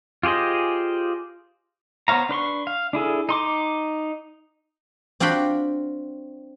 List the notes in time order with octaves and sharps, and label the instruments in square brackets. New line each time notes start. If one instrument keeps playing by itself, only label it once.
[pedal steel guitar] F4 G4 G#4 C5 D#5
B3 C5 C#5 F5 A#5
D4 B4 C6 C#6
F5
D4 E4 G#4 A4
D#4 C6 D6
[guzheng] C4 D4 F4 F#4 G5 B5